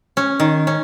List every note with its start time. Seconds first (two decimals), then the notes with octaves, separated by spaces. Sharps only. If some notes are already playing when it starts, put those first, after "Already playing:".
0.17 C#4
0.40 D#3
0.67 C#4